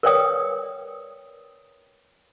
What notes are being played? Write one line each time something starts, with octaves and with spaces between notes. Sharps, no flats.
A#4 B4 C#5 D5 G5 D#6